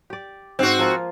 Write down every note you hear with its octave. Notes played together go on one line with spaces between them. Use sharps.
G4 D5
G#2 C4 F#4 F5
F3 A#3 F4